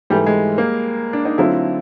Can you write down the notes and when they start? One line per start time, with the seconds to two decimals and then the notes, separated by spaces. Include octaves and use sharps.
0.10 G#2 E3 G3 A3
0.26 G#3
0.58 A#3
1.13 D4
1.25 D#4
1.38 D3 F#3 A3 C4 E4 F4